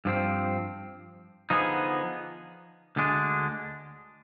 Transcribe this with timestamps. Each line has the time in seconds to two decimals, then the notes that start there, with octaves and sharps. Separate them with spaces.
0.05 G2 F3 C4
1.50 D3 F3 B3 D#4 G#4
2.96 D2 D3 G#3 D4